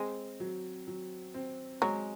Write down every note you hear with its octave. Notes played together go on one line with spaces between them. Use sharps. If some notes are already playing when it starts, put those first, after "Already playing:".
Already playing: G#3 C4
F#3
F#3
C4
F#3 G#3